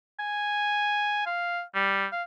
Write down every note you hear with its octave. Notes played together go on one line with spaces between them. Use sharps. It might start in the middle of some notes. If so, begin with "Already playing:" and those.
G#5
F5
G3
F5